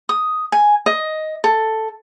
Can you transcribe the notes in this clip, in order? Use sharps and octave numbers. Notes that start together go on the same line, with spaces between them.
D#6
G#5
D#5
A4